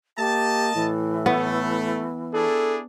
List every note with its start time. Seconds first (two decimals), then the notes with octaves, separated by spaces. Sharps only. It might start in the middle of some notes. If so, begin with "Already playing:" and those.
0.18 A#3 G4 D#5 A5
0.75 A2 E3
1.26 A3 B3
2.33 D4 E4 G#4 A4